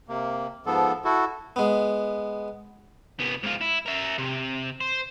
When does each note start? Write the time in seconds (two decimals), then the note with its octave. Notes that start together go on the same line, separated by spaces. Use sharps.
0.08 C3 A#3
0.66 G#2 F3 B3 A4
1.05 E4 F#4 A4
1.56 G#3 B3
3.19 C2 B3
3.44 G#2 F4
3.61 E4
3.86 A#4 E5
4.18 C3
4.81 C5